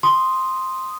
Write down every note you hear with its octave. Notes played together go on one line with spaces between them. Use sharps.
C6 D#6